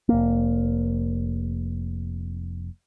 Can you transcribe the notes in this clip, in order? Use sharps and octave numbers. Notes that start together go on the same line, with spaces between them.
F1 A#3